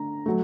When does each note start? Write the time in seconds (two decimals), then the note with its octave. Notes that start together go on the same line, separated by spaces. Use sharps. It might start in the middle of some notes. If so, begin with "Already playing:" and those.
Already playing: D3 A3 A#5
0.26 F#3 A3